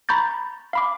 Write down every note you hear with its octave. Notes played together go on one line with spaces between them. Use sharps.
A#5 B5 C#6 G6 A6
F5 B5 D6